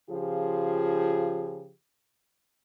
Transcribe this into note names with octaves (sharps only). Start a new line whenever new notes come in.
C#3 F3 F4 G4 G#4